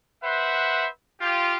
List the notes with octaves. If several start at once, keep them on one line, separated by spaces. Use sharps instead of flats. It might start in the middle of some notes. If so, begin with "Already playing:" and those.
B4 C5 E5 F#5
F4 G4